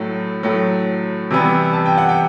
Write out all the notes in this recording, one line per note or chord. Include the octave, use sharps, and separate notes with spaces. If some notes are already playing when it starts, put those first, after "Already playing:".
Already playing: A2 F#3 A3
A2 F#3 A3
C3 E3 G3 B3
A5
G5
F#5
G5